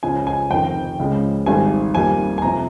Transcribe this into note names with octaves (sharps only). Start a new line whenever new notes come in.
C#2 C#3 F3 G#5
G#5
F1 F2 D#3 G5
C#2 C#3 G#3
G#1 G#2 G3 G#5
F2 D#3 G3 A#3 G#5
G#5
F2 C3 A#5